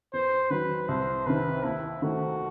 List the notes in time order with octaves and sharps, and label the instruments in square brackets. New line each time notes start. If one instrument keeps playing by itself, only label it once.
[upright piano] E2 [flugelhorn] C5
[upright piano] D#3 F#3 [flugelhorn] B4
[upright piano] C2 [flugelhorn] C5
[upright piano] C3 D#3 [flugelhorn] B4
[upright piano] D#2 [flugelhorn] E4
[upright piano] D#3 A3 C4 [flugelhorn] F#4